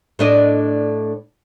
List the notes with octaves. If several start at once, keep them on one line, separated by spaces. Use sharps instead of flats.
A2 D4 D#5